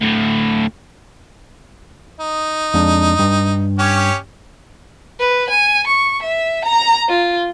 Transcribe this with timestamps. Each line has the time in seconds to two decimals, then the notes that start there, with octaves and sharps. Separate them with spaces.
0.01 D2 A2
2.20 D#4
2.74 F2 G#3 D4
3.19 G2
3.79 C#4 G4 C#5
5.20 B4
5.50 G#5
5.87 C#6
6.23 E5
6.65 A#5
7.09 F4